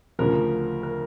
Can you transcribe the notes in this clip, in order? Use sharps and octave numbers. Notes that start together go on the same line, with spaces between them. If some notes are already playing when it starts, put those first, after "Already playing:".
D2 C#3 F3 A#4
A#4